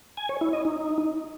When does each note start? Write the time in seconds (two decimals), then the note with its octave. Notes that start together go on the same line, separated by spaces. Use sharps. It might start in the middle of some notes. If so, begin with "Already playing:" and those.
0.17 G#5
0.29 C#5
0.41 E4
0.53 D#5
0.65 D#4